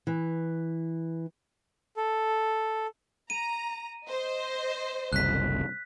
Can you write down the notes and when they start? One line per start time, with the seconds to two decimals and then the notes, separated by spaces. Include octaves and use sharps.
0.07 E3
1.96 A4
3.30 A#5 D#7
4.07 C5 D#5
5.13 F#1 C2 F#6 B6